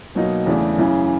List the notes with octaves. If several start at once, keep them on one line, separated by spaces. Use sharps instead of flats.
B2 F#3 A#3 D#4
E2 C#3 E3 A3 D4
F#2 C#3 E3